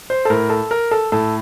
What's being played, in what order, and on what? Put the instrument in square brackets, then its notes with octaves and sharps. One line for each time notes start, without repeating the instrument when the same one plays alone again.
[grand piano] C5
A4
A2 A#4
A4
A#4
A4
A2 A4